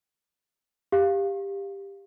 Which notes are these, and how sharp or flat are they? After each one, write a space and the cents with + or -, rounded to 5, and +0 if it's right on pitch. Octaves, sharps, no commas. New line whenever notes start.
G4 +15 F5 +0